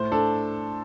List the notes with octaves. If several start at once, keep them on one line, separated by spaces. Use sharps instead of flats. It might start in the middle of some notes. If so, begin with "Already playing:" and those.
Already playing: A2 C5
D4 A4